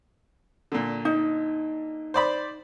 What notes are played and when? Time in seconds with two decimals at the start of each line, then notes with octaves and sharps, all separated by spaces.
0.72 A#2 D3
1.05 D#4
2.14 C5 D5 B5